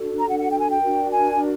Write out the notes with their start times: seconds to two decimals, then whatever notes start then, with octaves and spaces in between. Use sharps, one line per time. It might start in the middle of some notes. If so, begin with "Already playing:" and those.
Already playing: D4 F#4 A4
0.18 A#5
0.28 F#5
0.39 F#5
0.49 G5
0.59 G#5
0.70 G5
0.80 D4 F#4 A#4
1.11 G#5